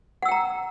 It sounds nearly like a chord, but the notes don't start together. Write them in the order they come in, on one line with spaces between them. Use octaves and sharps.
F#5 E6 G5 A#5